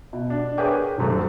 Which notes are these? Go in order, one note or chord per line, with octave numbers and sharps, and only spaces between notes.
B2
D4
G#4 A#4 B4 C#5 G5 D6
D#1 F#2 A3